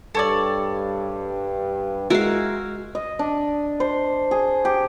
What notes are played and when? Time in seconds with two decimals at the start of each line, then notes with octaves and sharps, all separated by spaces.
0.15 G2 A4 C#5 D5
2.10 G#3 E4 F#4 A#4 F5
2.95 D#5
3.19 D4
3.80 C5
4.31 G#4
4.65 G4